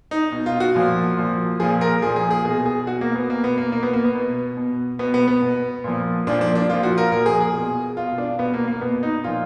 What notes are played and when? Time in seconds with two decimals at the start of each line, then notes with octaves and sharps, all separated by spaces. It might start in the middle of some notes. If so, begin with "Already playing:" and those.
0.11 D#4
0.32 B2
0.46 F4
0.60 F#4
0.75 A#2 F3
1.17 A#2 F3
1.60 A#2 F3 G#4
1.81 A#4
2.02 A#2 F3 G#4
2.16 G#4
2.31 G#4
2.45 B2 G#4
2.65 G#4
2.87 B2 F#4
3.01 A#3
3.15 B3
3.29 B2 A#3
3.44 B3
3.58 A#3
3.72 B2 A#3
3.83 B3
3.93 A#3
4.04 B3
4.15 B2
4.57 B2
4.99 B2 B3
5.14 B3
5.28 B3
5.42 B2
5.84 A#2 F3
6.27 A#2 F3 D4
6.41 D4
6.55 D4
6.69 A#2 F3 F4
6.83 F#4
6.98 A#4
7.12 A#2 F3 A#4
7.26 G#4
7.41 G#4
7.55 B2
7.97 B2 F4
8.18 D4
8.39 B2 B3
8.54 A#3
8.68 A#3
8.81 B2 B3
9.03 D#4
9.24 A#2 F3 F4